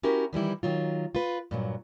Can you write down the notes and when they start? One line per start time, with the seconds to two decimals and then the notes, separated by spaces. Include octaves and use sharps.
0.03 C#4 E4 F#4 G4 A#4
0.33 D#3 E3 G3 E4
0.63 D#3 F#3 F4
1.15 F4 B4
1.51 G2 A#2 F#3